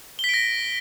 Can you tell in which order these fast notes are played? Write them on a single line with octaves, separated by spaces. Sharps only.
G7 B6 D7 A#6